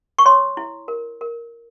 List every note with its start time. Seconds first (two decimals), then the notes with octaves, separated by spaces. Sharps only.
0.19 C#6
0.26 C#5 C6
0.57 E4
0.88 A#4
1.21 A#4